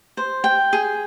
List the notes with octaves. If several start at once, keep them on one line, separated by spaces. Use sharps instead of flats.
C5
G5
G#4